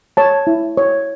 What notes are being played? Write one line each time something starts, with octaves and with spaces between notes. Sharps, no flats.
C#5 A5
E4
C#5